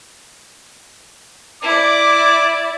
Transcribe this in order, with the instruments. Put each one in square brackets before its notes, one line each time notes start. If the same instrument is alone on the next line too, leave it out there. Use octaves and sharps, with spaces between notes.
[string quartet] E4 D5 [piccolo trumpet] D6